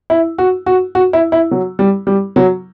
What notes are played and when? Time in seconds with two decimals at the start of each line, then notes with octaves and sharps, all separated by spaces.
0.10 E4
0.38 F#4
0.66 F#4
0.95 F#4
1.13 E4
1.32 E4
1.51 F#3
1.79 G3
2.07 G3
2.36 F#3